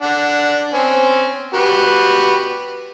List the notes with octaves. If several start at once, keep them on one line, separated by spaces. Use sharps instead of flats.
D4 F#5
C4 C#4
F#4 G4 B4